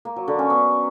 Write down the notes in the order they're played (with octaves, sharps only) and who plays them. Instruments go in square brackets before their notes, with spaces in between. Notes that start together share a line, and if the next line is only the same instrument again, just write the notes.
[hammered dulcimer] A#3
F#3
D3
C#4
B3